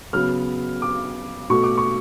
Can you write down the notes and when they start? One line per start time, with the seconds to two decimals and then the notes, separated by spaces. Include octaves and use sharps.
0.13 C#3 F#3 B3 F6
0.82 D6
1.50 B2 A3 C#6
1.64 D6
1.78 C#6